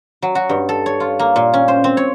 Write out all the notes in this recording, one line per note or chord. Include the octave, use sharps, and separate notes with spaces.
F#3
F#4
G2
A4
C#5
F4
A#3
A#2
C#4
C5
C4
C#5